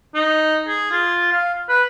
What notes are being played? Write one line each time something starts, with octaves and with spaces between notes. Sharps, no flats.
D#4
G#4
F4
F5
B4